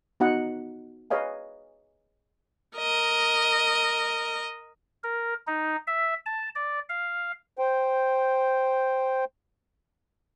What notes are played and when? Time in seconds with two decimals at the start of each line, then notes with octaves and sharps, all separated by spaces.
0.20 B3 D#4 F#4 D#5 F#5
1.10 G#4 B4 C#5 D#5 F5 G#5
2.77 A#4 D#5
5.03 A#4
5.47 D#4
5.87 E5
6.26 A5
6.55 D5
6.89 F5
7.59 C5 G5